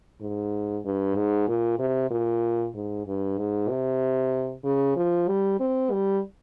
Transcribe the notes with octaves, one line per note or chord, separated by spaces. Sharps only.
G#2
G2
G#2
A#2
C3
A#2
G#2
G2
G#2
C3
C#3
F3
G3
C4
G3